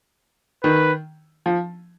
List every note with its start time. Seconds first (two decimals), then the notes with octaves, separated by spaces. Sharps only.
0.64 D#3 B4
1.46 F3